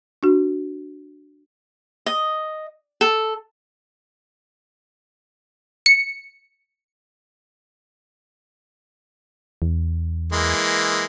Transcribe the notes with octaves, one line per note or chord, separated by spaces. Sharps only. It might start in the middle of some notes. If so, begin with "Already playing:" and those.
D4 F#4
D#5
A4
C#7
E2
E3 G#3 A#3